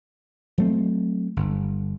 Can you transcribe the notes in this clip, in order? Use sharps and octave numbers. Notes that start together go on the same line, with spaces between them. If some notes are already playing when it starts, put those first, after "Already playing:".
F#3 A3 C4
G1